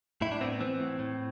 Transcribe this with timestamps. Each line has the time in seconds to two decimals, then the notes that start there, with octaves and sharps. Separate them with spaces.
0.21 A2 E4
0.32 D4
0.41 B3 C4
0.60 E3 C4
0.80 A2
0.99 A2